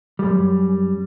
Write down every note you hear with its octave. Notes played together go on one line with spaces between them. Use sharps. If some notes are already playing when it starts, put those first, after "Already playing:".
F#2 G3